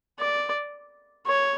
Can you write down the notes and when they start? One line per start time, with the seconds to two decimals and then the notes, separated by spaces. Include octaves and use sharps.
0.20 D5
1.27 C#5